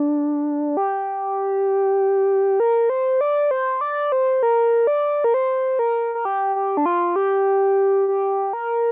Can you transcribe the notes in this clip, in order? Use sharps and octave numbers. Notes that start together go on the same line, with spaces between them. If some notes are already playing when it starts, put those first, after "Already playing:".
Already playing: D4
G4
A#4
C5
D5
C5
D5
C5
A#4
D5
A#4
C5
A#4
A#4
G4
G4
D4
F4
G4
G4
A#4